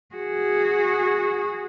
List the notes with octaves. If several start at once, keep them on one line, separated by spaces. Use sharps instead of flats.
F#4 G#4